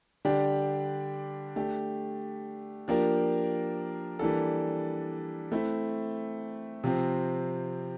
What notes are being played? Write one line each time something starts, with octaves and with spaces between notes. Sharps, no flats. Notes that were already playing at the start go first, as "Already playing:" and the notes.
D3 G3 D4 G4
A3 D4 G4
F3 A#3 D4 G4 A#4
E3 G3 A#3 D4 A4
A3 C4 E4
C3 F3 C4